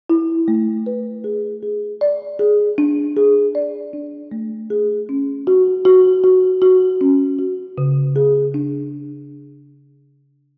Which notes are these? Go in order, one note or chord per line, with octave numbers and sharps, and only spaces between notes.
E4
A3
B4
G#4
G#4
D5
G#4
D4
G#4
D5
D4
A3
G#4
C#4
F#4
F#4
F#4
F#4
C#4
F#4
C#3
G#4
D4